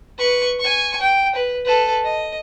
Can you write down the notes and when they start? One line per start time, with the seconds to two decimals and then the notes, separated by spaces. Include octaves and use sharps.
0.18 B4 C#6
0.60 G#5 C#6
1.01 G5
1.35 B4
1.65 A4 B4
2.04 D#5